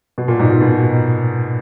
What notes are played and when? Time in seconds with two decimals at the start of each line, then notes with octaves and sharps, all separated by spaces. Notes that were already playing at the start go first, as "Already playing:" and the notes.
0.18 B2
0.28 A#2
0.39 G#2
0.50 A#2
0.61 B2